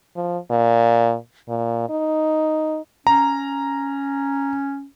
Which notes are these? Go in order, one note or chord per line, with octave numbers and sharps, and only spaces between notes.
F3
A#2
A#2
D#4
C#4 A#5